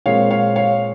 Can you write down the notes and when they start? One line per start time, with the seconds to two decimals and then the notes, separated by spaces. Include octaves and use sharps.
0.06 A#2 G#3 C4 C#5 F5
0.31 C#5 F5
0.56 C#5 F5